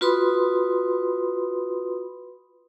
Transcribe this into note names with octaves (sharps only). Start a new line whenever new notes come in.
F4 F#4 B4 B5 C6 D#6